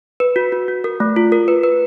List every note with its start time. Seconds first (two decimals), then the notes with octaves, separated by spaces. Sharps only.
0.20 B4
0.36 F#4
0.52 F#4
0.68 F#4
0.84 A#4
1.00 A3
1.16 F4
1.32 A#4
1.48 B4
1.63 B4